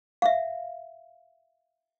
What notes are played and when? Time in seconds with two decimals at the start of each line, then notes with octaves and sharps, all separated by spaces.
0.22 E5 F5